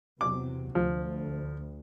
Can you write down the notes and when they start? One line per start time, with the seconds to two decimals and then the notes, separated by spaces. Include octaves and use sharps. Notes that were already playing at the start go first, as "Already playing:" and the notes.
0.21 E2 C3 F#3 D6
0.75 D2 F3